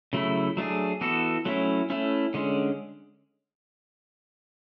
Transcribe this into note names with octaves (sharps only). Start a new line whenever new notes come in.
C#3 F#3 A3 E4
F#3 A3 D4 G#4
E3 B3 F#4 A4
F#3 A3 C#4 E4
A3 C#4 E4
D3 G#3 C#4